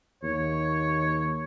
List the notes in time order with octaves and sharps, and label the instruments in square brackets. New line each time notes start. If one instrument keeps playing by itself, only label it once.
[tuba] D#2 [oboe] C#5